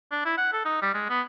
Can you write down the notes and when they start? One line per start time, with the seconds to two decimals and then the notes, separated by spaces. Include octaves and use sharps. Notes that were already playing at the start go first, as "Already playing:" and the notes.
0.12 D4
0.25 E4
0.38 F#5
0.53 A4
0.65 D#4
0.82 G3
0.95 G#3
1.09 B3